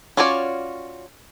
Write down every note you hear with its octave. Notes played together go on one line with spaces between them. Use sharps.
C#4 F4 F#4 C#5 D5